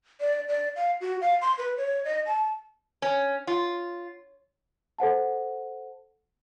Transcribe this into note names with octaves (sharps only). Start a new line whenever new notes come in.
D5
D5
F5
F#4
F5
C6
B4
C#5
D#5
A5
C#4
F4
A4 C5 F#5 A5